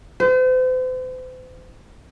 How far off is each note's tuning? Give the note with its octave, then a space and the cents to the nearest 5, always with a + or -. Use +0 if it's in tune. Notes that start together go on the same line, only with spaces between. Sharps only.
C5 -40